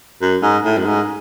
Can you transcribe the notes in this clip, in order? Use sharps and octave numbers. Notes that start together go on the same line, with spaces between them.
F#2
G#2
A2
F#2
G#2